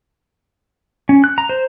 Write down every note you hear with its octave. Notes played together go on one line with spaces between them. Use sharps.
C#4
F#6
A#5
C5